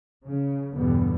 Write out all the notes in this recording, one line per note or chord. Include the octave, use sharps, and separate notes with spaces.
C#3
E2 G2 B2 D3 G3 B3